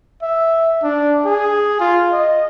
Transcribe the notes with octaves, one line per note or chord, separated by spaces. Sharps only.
E5
D4
G#4
F4
D#5